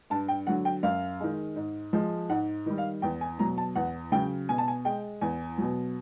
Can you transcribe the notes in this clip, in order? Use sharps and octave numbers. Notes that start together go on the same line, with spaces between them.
G2 A5
G5
D3 F#3 F#5
G5
F#2 F5
D#3 G#3
G#2
F3 G#3
G#2 F#5
D#3 G3
F5
E2 G5
G#5
B2 F#3 A#5
A5
E2 F#5
C#3 F#3 G5
B2 G#5
A5
G#5
G#3 G5
E2 G#5
B2 F#3